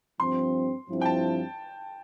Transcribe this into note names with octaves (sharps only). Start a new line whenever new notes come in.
G2 F3 C4 C6
G2 F3 C4 E4
G5
A5